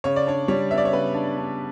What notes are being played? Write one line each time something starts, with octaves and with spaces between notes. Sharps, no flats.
C#3 C#5
D5
D4 C#5
G3 C#5
B3 E5
D5
C#5
C#3 B4
D4
D4